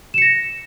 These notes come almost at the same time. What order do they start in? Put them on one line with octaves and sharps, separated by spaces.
E7 C#7 A#6